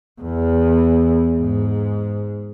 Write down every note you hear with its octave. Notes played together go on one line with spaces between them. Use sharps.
E2
G#2